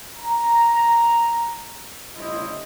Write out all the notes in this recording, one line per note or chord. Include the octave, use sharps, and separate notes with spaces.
A#5
G1 C#2 A2 E4 C5 D#5